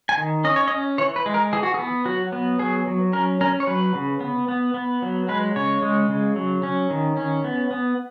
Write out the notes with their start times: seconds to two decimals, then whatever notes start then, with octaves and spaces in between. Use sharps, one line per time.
0.09 G#5
0.18 D#3
0.44 C#4 D#5
0.56 C#5
0.68 C#4 D#5
0.98 E3 C#5
1.16 B4
1.26 G#3
1.34 A#4
1.53 E3 G#4
1.63 F#4
1.74 G#4
1.79 B3
2.06 F#3 F#4
2.32 B3
2.59 F#3 G#4
2.87 F#3
3.13 C#4 A#4
3.41 C#4 A#4
3.60 C#5
3.67 F#3 B4
3.95 C#3
4.21 B3
4.48 B3
4.74 B3
5.02 F#3
5.28 G#3 B4
5.56 C#3 C#5
5.82 G#3
6.09 C#3
6.36 F#3
6.63 C#4
6.90 D#3
7.17 C#4
7.44 B3
7.71 B3